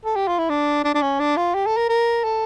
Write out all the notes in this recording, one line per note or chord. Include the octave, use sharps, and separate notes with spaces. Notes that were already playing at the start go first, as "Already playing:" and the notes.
A4
G4
F4
E4
D4
D4
D4
C#4
D4
F4
G4
A4
A#4
A#4
A4